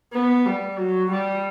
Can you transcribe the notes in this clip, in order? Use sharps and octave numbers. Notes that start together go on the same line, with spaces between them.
B3
G3
F#3
G3